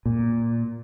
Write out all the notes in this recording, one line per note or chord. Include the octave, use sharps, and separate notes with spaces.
A#2